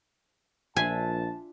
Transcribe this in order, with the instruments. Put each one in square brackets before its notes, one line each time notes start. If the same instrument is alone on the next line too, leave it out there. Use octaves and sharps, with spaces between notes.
[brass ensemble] A#1 A5 [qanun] D4 F4 E5 [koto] G#5